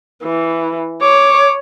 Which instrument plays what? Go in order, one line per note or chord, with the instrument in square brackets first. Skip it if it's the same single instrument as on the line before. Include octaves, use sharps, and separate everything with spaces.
[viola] E3
[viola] C#5 [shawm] D6